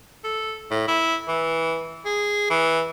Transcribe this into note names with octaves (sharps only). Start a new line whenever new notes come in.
A4
A2
E4
E3
G#4
E3